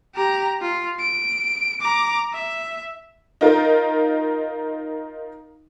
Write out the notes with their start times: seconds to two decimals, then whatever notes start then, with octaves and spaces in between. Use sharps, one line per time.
0.15 G4 A#5
0.62 F4
0.99 D7
1.81 A#5 D6
2.33 E5
3.41 D#4 F4 A#4